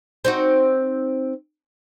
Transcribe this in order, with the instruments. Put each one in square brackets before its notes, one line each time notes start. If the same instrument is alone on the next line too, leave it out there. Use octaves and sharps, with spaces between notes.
[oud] C4 D#4 F#4